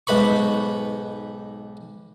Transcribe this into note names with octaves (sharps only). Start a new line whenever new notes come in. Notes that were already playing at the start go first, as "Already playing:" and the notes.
B1 G#2 B4 B5 C#6